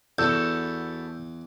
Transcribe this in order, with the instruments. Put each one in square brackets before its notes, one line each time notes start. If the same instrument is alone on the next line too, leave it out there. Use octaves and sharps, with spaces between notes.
[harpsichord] E2 [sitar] B3 F#4 A4 [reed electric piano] E6 G6